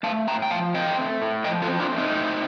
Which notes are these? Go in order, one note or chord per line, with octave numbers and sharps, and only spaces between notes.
A3 F5 A5
A2 G5 A#5
G5
F3 F5 A5
C4 D#5 G5
A3
A2
F3 D#5 G5
F4 A4
C4
D4 F4
A3
C4 D#4
A2